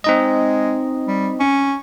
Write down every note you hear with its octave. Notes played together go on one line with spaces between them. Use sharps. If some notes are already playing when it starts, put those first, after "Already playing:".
G#3 C4 D#4 D#5
G3
C#4